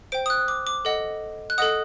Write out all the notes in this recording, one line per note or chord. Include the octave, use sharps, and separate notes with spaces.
C5 G5 D7
D#6
F#6
D6
D6
A4 D#5 F#5
F#6
A4 D#5 F#5 D#6